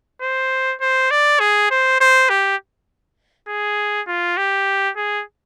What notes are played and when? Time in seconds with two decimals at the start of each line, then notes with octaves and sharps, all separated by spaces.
0.22 C5
0.81 C5
1.11 D5
1.40 G#4
1.70 C5
2.00 C5
2.29 G4
3.48 G#4
4.07 F4
4.37 G4
4.97 G#4